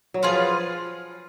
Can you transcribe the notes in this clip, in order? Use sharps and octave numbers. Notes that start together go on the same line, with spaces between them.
F#3
F3 F4 G#4 B4 F5